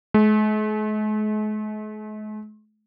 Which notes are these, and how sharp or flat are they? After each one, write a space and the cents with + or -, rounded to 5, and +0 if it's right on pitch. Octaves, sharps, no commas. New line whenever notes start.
G#3 +45